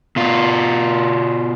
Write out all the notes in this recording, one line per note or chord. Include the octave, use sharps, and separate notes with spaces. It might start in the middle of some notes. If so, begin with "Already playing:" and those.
B2 F4